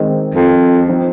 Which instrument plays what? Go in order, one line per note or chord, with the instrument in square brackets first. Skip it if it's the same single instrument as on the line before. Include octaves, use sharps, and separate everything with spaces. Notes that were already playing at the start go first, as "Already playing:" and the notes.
Already playing: [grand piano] D#3 G#3 C4
[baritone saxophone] F2
[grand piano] F3 C4 D#4